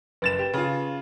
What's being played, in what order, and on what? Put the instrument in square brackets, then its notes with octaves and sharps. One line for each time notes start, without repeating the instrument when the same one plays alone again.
[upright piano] F#1 A6 E7 [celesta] B4
[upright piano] G4
C#3 F4